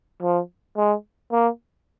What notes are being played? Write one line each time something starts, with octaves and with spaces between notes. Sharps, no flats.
F3
G#3
A#3